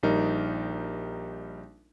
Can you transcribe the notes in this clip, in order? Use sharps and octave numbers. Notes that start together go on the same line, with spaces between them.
A#1 G3 D#4 A#4